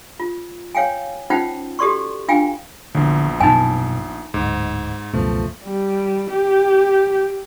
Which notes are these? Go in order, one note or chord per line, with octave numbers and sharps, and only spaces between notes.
F4
C#5 F5 G5 G#5
C#4 D#4 F4 C5 F#5 G5
F#4 G4 A4 D5 C6 C#6
D4 F4 F5 G5 G#5
A#1 E2 D3
F#2 B2 D#4 G#5
D1 G#2
C#2 F#2 B2 F3 A3
G3
G4